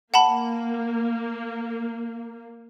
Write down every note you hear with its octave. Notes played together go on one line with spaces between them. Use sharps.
A#3 F#5 A5 B5